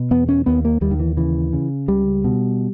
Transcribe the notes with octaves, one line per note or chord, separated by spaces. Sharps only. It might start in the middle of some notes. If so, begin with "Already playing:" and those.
Already playing: B2
E2 B3
C#4
D#2 B3
A#3
D#2 G3
D#3
E3
C#3 E3
C#3
C#2 G3
B2